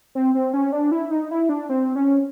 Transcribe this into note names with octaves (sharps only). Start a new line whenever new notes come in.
C4
C4
C#4
D4
E4
D#4
E4
D4
C4
C#4